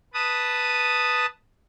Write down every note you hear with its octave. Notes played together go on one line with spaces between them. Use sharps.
B4 A5 D#6